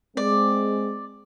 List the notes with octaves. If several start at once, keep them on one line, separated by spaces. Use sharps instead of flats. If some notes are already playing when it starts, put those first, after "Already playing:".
G#3 C4 D5